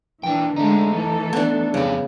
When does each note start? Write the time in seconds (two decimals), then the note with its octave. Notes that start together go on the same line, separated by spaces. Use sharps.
0.23 A#2 E3 D4 G5
0.56 D3 G#3 A3 D#4
0.93 E3 A4
1.33 B3 D4
1.74 F2 C#3 G3 B4